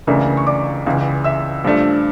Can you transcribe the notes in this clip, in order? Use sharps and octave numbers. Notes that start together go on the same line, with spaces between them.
C#2 C#3 E3 A3 D4 A#4 A#5
C#6
D5 D6
C#2 C#3 E3
E5 E6
G2 F3 A3 D4